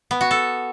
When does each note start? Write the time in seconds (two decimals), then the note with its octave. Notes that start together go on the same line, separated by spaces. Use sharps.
0.11 B3
0.21 F#4
0.31 A4